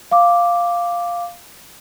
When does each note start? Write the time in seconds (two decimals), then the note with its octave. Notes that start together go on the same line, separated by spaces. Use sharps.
0.11 F5 D6